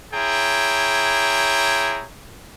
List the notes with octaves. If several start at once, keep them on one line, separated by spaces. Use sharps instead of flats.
E4 G#4 C#5 G5 A#5